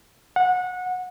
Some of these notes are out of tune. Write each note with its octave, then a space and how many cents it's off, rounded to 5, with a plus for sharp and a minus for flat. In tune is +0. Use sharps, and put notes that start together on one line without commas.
F#5 -25